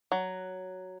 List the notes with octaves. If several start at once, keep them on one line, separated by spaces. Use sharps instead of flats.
F#3